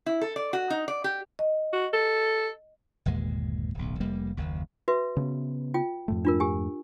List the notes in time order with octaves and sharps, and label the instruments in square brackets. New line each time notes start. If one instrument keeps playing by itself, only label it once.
[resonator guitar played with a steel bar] E4
A4
D5
F#4
D#4
D5
G4
[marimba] D#5
[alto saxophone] F#4
A4
[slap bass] G1 D#2 A#2 G#3
D1 B1
F1 G3 A#3
F#1 D#2
[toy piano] F#4 B4 E5
[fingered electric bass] C#3 B3
[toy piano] F4 G5
[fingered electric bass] F2 G#2 A3
[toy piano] D4 F4 A#4
G4 G#5